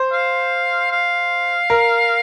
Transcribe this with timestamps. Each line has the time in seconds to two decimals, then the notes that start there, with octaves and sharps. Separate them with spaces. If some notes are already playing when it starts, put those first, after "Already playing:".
Already playing: C5
0.12 F5
0.91 F5
1.70 A#4